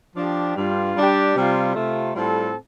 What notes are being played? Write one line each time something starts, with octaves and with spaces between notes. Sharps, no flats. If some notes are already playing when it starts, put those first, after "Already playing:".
F3 D4 G4
G2 G3 F4
G3 D4 G4
C3 G3 F4
C3 A3 F4
A2 G3 C4 F4 A4